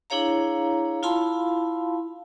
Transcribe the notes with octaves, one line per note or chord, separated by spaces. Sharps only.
D4 E4 G#4 C#5 F5 A#5
E4 F4 F5 A5 B5 C6